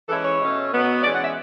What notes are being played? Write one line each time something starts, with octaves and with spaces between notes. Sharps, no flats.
E3 G#3 C#4 E4 A4
C#5
B2 A3 C#4
B2 F#3 B3
E3 G#3 C#4 D5
F#5
E5